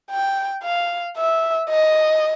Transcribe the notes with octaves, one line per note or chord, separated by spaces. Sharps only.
G5
F5
E5
D#5